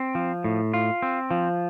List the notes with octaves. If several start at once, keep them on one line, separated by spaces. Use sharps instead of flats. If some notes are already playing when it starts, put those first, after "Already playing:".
Already playing: C4
F3
A2
F4
C4
F3